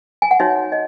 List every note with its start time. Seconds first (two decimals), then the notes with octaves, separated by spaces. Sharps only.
0.22 G#5
0.31 F#5
0.40 D#4 F#4 C#5 E5
0.72 D#5